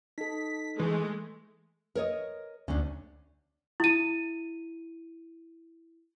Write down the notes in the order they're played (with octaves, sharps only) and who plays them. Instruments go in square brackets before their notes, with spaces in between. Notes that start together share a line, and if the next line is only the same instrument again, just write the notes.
[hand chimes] D#4 A4 [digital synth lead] B6
[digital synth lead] E3 [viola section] G#3 A3
[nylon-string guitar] A#4 C#5 D#5
[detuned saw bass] D2 [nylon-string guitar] C#4 D4
[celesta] E4 D#7